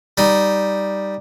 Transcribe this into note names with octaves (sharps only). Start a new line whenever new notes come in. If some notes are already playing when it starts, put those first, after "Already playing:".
G3 D#4